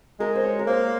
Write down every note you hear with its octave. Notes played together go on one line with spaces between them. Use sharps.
G#3 A#4
C5
C#5
A#4
A#3 C5